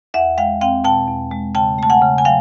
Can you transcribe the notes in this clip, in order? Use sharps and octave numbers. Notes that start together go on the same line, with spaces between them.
E2 E5 F#5
G#3 F5 G5
C4 F5 G5
B2 G5 A5
E2
G#3
C#3 G5 A5
A3 A5
F#5 G#5
C#3
G#5
F#3 F5 G5